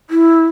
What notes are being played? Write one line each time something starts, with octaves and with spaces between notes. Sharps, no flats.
E4